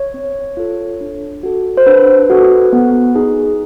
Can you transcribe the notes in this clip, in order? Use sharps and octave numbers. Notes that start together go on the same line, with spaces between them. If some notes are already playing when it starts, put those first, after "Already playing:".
Already playing: C#5
C4
F4 A4
D4
F#4 A4
C5
D4 B4
F#4 A4
B3
D#4 G#4